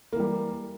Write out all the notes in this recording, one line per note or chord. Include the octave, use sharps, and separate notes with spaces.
E3 G3 A#3